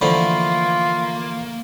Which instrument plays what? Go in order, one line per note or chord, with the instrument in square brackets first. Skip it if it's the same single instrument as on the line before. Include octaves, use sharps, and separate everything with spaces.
[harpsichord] D3 F3 A3 [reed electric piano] E3 B5 [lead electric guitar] A#3 [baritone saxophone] F4